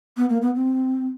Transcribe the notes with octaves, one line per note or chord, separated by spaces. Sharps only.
B3
A#3
B3
C4